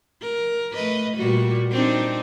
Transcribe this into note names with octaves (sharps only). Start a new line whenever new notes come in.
A#4
A3 B4 D#5
A#2 G3 F#4
C4 D4 D#4